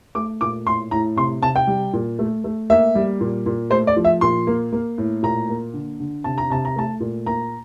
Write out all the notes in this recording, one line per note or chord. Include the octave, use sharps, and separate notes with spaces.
A3 D6
A#2 D6
A2 C6
A2 A#5
C3 C6
C3 A5
G5
G3
A#2
A3
A3
A#3 E5
G3
A#2
A#2
A3 C5
D5
F3
E5
A#2 C6
A#3
A#3
A2
A#2 A#5
A#3
D3
D3
C3 A5
A#5
C3 A5
A#5
A3 A5
A#2
A#3 A#5